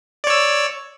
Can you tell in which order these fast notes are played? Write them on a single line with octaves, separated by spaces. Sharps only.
D5 C#5 E6